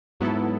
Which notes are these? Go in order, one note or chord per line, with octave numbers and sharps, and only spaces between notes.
G#2 F#3 B3 E4 A4